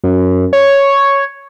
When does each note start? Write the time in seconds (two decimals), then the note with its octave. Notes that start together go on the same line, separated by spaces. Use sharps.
0.04 F#2
0.53 C#5